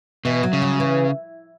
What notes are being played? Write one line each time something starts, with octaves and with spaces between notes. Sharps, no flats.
B2 E3
F#3
C#3
F#3
E3